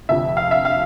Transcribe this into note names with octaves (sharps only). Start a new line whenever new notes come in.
F1 F2 D3 F3 E5
F5
E5
F5